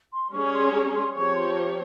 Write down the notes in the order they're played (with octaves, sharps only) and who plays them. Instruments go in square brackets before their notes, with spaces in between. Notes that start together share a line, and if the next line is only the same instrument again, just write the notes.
[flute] C6
[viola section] G3 C#4 G#4 C#5 [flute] C#6
[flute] C6
A#5
C6
[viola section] F3 C4 G4 C#5 [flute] C#6
[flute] C6
A#5